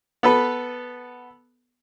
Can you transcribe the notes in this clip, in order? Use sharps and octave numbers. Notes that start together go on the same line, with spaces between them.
B3 A4 B4